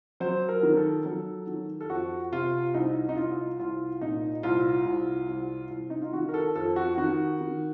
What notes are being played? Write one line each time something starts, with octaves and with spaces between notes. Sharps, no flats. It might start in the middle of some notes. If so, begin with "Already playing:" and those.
F#3 C5
A#4
D#3
A4
F#3 A4
D#3
A4
F2 F#4
C3 F4
C2 D#4
D#4
C2 F4
C2 F4
A#2 D#4
C2 F4
C2
C2
C2
D#4
F4
D#3 F#4
A#4
A4
F2 A4
F#4
D#3 F#4
D#3